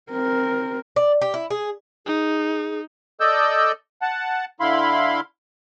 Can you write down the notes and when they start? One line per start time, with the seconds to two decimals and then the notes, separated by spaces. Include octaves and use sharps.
0.11 C4 A#4
0.96 D5
1.21 G4
1.34 E4
1.50 G#4
2.06 D#4 G#4
3.20 A4 D5 D#5 E6 G6
4.02 F#5 A5
4.60 D3 E4 F5 B5 C6